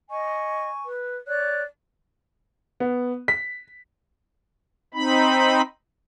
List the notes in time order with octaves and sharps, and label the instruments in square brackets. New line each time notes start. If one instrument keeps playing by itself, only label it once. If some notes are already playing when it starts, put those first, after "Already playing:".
[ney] D#5 [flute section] G#5 C#6
[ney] B4
[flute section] C#5 F#6 [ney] D5
[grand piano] B3
B6
[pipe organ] C4 D#4 B5